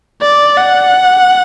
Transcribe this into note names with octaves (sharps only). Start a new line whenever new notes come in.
D5
F#5